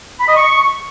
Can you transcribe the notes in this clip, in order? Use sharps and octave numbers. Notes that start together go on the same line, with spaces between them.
B5
D#5
C#6